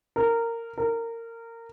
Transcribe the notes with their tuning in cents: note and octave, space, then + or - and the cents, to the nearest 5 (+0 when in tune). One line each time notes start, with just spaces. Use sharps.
A#4 -15
A#4 -20